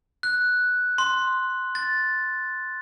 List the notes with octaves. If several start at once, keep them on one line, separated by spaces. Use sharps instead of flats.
F#6
C6
A6